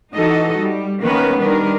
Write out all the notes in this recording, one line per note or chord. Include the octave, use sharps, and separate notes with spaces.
E3 D#4 F#4 A4 D#5
G3
D#3 A#3 B3 C#4 A#4 B4
D#3 G3 D4 A#4 B4